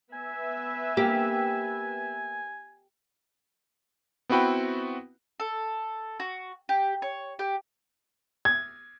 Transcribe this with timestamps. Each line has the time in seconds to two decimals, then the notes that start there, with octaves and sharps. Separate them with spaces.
0.13 B3 B4 E5 G#5
0.97 A#3 G4
4.29 B3 C4 E4 F#4 B4 G5
5.40 A4
6.20 F#4
6.69 G4
7.02 C#5
7.39 G4
8.45 G#6